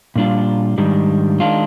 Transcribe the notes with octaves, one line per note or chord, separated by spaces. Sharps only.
A#2 G3 D4 F4
G#2 D#3 G3 D4
D#3 G#3 D4 F4